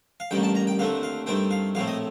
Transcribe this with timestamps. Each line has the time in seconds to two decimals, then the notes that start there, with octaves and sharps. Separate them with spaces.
0.20 F5
0.31 A1 G2 D#3 A#3 G5
0.43 A5
0.55 A#5
0.67 G5
0.79 D#2 D3 A3 C4 F5
1.03 F5
1.26 G2 D#3 A3 C4 G5
1.51 F5
1.75 A#1 A2 A3 C4 F5
1.88 D#5